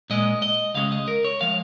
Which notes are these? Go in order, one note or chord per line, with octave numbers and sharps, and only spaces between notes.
A#2 G#3 D#5
D#5
C#2 C#3 G#3 F5
D#5
A#4
C#5
F3 G#3 F5